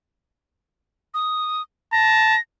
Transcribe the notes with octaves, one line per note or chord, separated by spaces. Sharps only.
D#6
A5 A#6